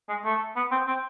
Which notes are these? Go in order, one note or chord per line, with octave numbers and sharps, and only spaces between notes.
G#3
A3
B3
C4
C4